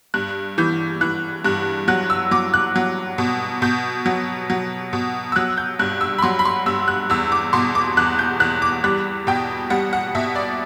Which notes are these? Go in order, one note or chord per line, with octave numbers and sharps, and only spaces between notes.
G2 F#6
E3 G6
E3 F#6
G2 F#6
F#3 F#6
E6
F#3 D6
F#6
F#3
B2
B2 G6
F#3
F#3
B2
E6
F#3 F#6
G6
G2 F#6
E6
B5
F#3 C6
B5
C6
G2 E6
F#6
E2 E6
D6
B2 C6
D6
E2 F#6
G6
E2 F#6
D6
G3 F#6
B2 G5
G3 F#5
F#5
B2 E5
D5